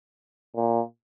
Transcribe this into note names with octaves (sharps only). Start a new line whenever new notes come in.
A#2